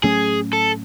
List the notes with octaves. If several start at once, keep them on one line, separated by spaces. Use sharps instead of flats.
A2 F#3 A3 C#4 G#4
A4